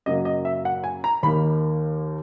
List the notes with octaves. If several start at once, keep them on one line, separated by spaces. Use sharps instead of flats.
F#2 C#3 F#3 A#3 D#5
D#5
E5
F#5
G#5
A#5
D#2 D#3 A#3 B5